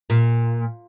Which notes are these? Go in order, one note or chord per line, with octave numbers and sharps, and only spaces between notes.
A#2